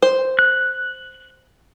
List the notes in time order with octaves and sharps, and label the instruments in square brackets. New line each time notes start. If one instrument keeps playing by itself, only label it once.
[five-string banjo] C5
[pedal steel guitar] F#6